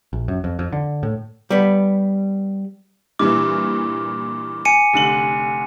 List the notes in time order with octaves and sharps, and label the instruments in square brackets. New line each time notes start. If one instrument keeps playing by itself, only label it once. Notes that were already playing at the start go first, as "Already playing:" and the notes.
[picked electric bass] A#1
F#2
F2
F2
D3
A2
[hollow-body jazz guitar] G3 B3
[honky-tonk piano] G2 A#2 E3 [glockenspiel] D6
[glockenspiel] G#5 C#7 D#7
[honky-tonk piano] F1 D3 F#7